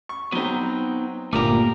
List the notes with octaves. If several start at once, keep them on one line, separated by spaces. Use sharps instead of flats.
C#6
F#3 B3 C4 D#4
G1 A#2 A3 G4 A#4 A#5 D6